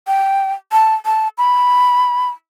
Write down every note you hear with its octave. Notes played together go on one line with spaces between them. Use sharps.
G5
A5
A5
B5